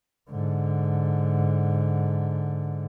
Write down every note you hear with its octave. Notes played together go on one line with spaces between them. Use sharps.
G#2 D3